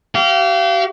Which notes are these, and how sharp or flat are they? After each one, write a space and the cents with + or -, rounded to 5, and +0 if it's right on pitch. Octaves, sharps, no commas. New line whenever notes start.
G4 -40 F5 -25